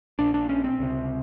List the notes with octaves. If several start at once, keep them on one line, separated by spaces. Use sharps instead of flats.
A#1 A#2 D4
D4
C#4
C4
C#2 C3